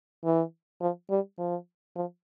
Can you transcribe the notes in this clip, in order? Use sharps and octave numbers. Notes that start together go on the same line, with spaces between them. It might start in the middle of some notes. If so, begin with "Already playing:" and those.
E3
F3
G3
F3
F3